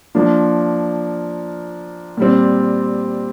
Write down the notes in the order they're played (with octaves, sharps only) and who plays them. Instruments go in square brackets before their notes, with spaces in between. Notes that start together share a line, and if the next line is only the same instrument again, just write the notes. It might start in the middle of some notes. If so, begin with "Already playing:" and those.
[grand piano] F3 A#3 D4 F4
A#2 G3 C4